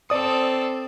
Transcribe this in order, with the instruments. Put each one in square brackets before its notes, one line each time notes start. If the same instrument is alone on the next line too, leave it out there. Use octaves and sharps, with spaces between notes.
[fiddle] C4 A4 [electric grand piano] D5 D#6